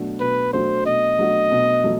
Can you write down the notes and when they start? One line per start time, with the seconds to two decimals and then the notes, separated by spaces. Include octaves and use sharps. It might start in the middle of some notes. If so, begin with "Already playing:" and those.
Already playing: B2 F#3 A3 D4 F#4
0.20 B2 B4
0.53 F#3 A3 D4 F#4 C5
0.86 B2 D#5
1.18 F#3 A3 D4 F#4
1.51 B2
1.84 F#3 A3